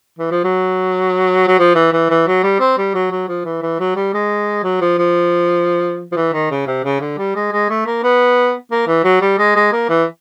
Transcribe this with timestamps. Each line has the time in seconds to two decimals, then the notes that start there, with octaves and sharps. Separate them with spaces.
0.18 E3
0.31 F3
0.44 F#3
1.48 F#3
1.59 F3
1.75 E3
1.93 E3
2.10 E3
2.27 F#3
2.43 G3
2.60 C4
2.78 G3
2.94 F#3
3.11 F#3
3.28 F3
3.45 E3
3.62 E3
3.80 F#3
3.96 G3
4.14 G#3
4.64 F#3
4.81 F3
4.98 F3
6.12 F3
6.16 E3
6.33 D#3
6.51 C#3
6.67 C3
6.84 C#3
7.01 D3
7.18 G3
7.35 G#3
7.52 G#3
7.70 A3
7.86 A#3
8.03 B3
8.71 A#3
8.87 E3
9.04 F#3
9.21 G3
9.38 G#3
9.56 G#3
9.72 A#3
9.89 E3